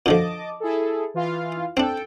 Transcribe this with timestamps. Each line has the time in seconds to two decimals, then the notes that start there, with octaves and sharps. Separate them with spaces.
0.06 A#2 D3 F3 D#5 A5 D6
0.60 E4 G#4 A4
1.14 E3 F4 F5
1.77 C4 D4 A4 G5